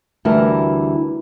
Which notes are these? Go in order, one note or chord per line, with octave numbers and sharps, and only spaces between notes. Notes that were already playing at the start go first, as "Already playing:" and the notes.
D2 E3 G3 E4 A#4